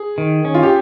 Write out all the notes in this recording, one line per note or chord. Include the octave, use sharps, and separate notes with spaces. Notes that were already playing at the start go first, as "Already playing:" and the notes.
Already playing: G#4
D#3
C#4
F4
G4